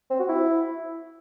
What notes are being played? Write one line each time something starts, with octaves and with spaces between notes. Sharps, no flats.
C4
F#4
E4